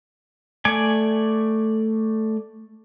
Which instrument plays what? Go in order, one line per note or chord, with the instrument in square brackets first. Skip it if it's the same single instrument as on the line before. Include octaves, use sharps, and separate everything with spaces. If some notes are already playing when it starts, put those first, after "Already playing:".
[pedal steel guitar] A3 D5 G#5